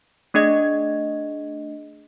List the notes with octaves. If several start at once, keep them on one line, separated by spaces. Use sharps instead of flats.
A3 D4 G#4 D#5 G#6